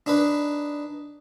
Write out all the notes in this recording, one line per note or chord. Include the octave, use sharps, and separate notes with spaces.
D4 D#4 B4